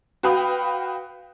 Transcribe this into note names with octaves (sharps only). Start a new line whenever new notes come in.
F#4 B4 F5 G5 B5 D#6